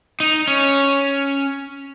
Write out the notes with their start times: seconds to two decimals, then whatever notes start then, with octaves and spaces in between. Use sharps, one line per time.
0.20 D#4
0.47 C#4